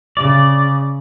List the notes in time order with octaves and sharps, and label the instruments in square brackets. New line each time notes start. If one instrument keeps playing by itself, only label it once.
[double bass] C#3 [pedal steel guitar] D5